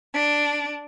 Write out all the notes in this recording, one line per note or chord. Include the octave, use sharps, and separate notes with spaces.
D4